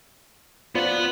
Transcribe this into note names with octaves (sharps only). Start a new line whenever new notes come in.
B3 F4 C5 D5 F#5